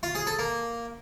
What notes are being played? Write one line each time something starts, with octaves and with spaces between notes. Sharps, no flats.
F4
G#4
A4
A#3